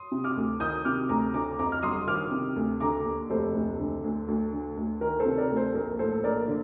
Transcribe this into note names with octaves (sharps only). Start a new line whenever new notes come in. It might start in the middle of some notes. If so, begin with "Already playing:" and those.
Already playing: C6 D#6
C3
D6 F6
D2
D#3 D#6 G6
C3 D6 F6
D2 A#5 D6
D3 A#5 D6
F2 A#5 D6
F6
G1 C6 D#6
D#3 D6 F6
C3
D2
D3 A#5 D6
D#2
F1 A4 C5
D2
D3
D2
D2
D3
D2
D#3 A#4
A4 C5
C3
A#4 D5
D2
A4 C5
A#1 A#4
A2 A4 C5
A#1 A#4 D5
D3